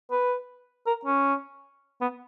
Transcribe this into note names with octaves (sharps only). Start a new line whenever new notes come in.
B4
A#4
C#4
B3